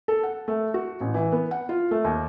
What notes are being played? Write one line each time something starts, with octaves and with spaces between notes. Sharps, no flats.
A4
F#5
A3
F#4
A1
E3
B3
F#5
F4
A3
D#2